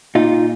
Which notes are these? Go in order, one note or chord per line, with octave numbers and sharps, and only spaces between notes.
A#2 D#4 F4